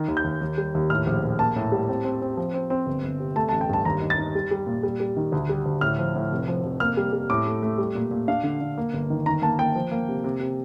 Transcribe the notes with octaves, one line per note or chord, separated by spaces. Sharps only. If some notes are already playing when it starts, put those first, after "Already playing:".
Already playing: D#3
D#2
G6
D#2
D#2
G3
D#2
A2 F6
A#1
A#1
A#3 A5
A2
G3
C4
C4
C4
F3
C4
C4
G1
G1
C3
A3 A5
A5
A1
G5
G2 A5
D#2 A#5
D#4
A6
D#4
G3
G3
A#2
G3
G3
D#3
D2
G3
D2
A2 F6
F3
A2
F1
F3
F1
A#3 F6
G3
G3
A2 D6
A3
A3
G3
A#2
A#2
D4 F5
D3
D3
A#3
G1
D#3
D#3 A#5
A#3 A5
A#3 G5
F3
A#3
C3
C3
C3